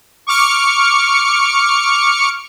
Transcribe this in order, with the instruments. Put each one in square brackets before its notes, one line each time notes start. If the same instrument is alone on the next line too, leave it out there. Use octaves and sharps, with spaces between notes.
[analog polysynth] C#6 D6 F6 C#7